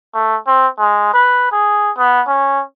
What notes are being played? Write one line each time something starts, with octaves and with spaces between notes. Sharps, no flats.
A3
C4
G#3
B4
G#4
B3
C#4